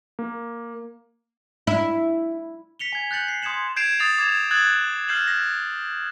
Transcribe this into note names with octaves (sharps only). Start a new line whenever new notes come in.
A#3
E4
B6 C#7 F7 G7
G#5 G#6
F#6 G6 A6 C#7 F#7
C7
C6 D#6 G#6 C#7 E7 F#7
G6 G#6 C7 D7 E7 F7
D#6 A6 C7 F7
D6 G#6 E7 F7
D#6 E6 F#6 G#6 A6 F#7
F6 G6 C7 E7 F#7
A#6